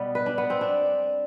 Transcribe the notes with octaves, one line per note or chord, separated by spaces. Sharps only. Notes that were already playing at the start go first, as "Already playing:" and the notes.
Already playing: B2 G3 B3 D5
B4
D4
B3
C4
D4